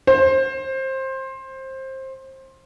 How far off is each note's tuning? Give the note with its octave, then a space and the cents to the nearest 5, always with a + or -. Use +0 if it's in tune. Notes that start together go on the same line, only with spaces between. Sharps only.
C5 +20